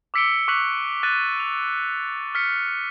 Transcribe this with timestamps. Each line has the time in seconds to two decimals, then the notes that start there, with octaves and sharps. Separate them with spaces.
0.14 D6 E6 B6 C#7 D7 G7
0.48 C#6 D6 F#6 B6 F7 F#7
1.03 F#6 A6 D#7
1.40 F7
2.35 F6 B6 C#7